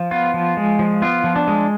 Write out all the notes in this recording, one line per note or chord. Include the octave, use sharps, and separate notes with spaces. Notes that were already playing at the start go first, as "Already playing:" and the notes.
Already playing: F3
B3 F4
F3
G#3
F3
B3 F4
F3
D4
G#3